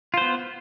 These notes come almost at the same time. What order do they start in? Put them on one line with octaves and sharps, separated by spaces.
F4 C5 B3